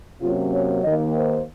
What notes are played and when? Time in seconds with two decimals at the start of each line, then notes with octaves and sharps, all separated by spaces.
0.21 C3 F#3 A#3 C#4 F4
0.52 C#5
0.84 D#2 D#3 A#3 D#5
1.15 C5